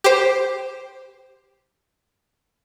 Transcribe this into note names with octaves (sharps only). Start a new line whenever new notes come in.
G4 C5